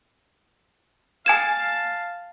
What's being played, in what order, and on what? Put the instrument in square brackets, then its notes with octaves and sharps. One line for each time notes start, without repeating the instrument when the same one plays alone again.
[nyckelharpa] F5 A5 [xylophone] G#5 G#6 E7